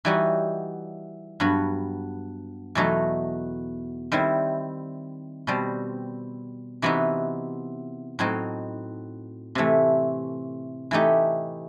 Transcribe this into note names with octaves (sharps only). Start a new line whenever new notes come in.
E3 G3 D#4 F#4
G2 F#3 B3 F#4
E2 B2 F#3 A3 D#4
D#3 G3 C4 E4
B2 G3 C4
C3 E3 B3 D#4 F#4
A2 F#3 C4 D#4
C3 E3 A3
E3 A3 D#4 G4